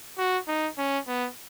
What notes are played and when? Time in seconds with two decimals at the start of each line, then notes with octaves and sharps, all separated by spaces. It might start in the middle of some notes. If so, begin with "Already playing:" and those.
0.18 F#4
0.48 D#4
0.78 C#4
1.08 B3